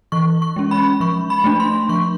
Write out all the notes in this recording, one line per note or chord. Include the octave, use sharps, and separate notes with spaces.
E3 C#6
C#6
G#3 C#4
B5
F3 C#6
B5
A3 D4
C6
F3 C#6